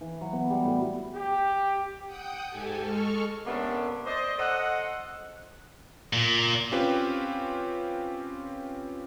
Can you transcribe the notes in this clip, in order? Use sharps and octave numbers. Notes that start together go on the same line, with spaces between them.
E3
F#3
B3
G3
A2
G4
F#5 G5 D#6 G6
G#2 G4 A4 G#5
G#3 A4 C#6 F6
C3 A#3 B3 C#4 D4 A4
C5 D5 D#5
A4 C5 D#5 F#5
A#2
C4 C#4 F4 G4 B4